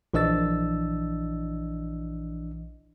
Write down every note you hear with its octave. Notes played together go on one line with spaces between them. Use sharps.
A#1 E3 D4 D#5 E6 A6